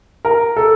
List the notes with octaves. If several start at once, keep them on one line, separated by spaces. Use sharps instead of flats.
A#4
A4